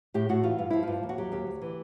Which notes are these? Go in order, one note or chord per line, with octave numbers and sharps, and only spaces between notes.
A2 G4
A2 F#4
E3 F4
G2 F4
F3 E4
G2 F4
D#2
F#4
F#3 G4
D#2 G4
D2
E3